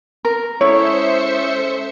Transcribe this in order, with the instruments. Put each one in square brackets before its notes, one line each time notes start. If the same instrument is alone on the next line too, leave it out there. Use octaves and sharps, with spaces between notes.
[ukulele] A#4
[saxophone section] G#3 C#4 A4 [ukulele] E4 [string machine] C5 E5 C#7 [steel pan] C#5